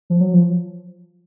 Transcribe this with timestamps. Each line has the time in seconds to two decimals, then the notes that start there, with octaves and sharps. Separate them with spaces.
0.10 F3
0.21 F#3
0.34 F3